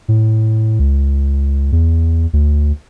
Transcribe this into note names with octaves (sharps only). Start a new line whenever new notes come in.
A2
C#2
E2
D2